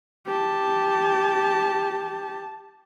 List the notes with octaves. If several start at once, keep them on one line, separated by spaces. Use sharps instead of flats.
G4 A5